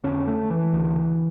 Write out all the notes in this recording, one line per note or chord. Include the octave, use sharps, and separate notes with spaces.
F2 D3 C#4
A3
E3
D2 C#3